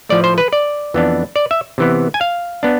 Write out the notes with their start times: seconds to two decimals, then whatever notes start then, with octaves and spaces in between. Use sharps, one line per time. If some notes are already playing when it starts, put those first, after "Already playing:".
0.09 A2 F3 A3 D5
0.24 C5
0.38 B4
0.53 D5
0.94 F2 E3 B3 D4
1.36 D5
1.51 E5
1.78 C3 E3 B3
2.14 G#5
2.21 F5
2.63 B3 D4